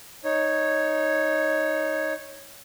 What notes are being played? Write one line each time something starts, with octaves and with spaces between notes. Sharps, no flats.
D#4 C#5